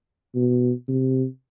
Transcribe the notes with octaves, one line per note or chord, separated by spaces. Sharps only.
B2
C3